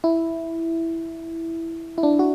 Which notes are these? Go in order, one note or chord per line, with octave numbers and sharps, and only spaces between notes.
E4
E4
D4
F#4